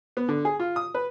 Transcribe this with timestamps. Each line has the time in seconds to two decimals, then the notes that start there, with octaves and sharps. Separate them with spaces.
0.17 B3
0.28 D3
0.45 G#4
0.59 F4
0.76 D#6
0.94 B4